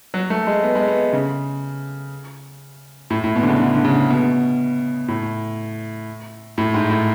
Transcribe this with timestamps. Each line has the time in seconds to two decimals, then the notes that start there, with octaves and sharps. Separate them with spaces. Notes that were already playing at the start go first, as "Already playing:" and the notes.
0.14 F#3
0.30 A3
0.47 G#3
0.63 B3
0.75 G#3
0.88 B3
1.13 C#3
3.10 A2
3.24 A2
3.36 B2
3.43 D3
3.49 C#3
3.60 D3
3.75 D3
3.85 C#3
4.10 B2
5.08 A2
6.58 A2
6.74 G#2
6.90 A2